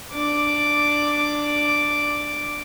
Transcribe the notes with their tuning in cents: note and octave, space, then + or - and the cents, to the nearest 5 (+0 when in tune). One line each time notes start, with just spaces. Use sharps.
D4 +5 D6 +0